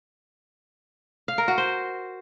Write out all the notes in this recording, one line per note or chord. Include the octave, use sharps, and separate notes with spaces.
F5
A#4
F#4
C5